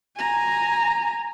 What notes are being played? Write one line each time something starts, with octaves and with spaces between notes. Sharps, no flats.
G#5 A#5